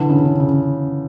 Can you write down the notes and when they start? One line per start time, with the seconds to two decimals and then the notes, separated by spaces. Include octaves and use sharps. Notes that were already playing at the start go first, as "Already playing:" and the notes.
Already playing: D3 E3
0.10 C#3
0.25 C#3
0.40 C#3